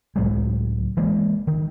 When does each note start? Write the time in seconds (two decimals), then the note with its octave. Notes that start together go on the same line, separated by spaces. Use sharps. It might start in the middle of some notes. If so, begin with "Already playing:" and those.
0.16 C#2 A2 F#3 G#3
0.97 E3 G#3 A#3
1.47 D#3